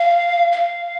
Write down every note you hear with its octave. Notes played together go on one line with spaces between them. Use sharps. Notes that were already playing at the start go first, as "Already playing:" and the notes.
Already playing: F5
F5